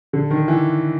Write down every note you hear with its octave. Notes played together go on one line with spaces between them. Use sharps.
D3
D#3
E3